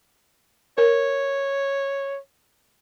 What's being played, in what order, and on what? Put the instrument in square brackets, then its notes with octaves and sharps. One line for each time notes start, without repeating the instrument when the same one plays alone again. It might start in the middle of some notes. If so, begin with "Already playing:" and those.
[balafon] A#4 [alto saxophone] C#5